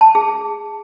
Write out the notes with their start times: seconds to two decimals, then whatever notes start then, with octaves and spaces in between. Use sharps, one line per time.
0.01 A5
0.15 G#4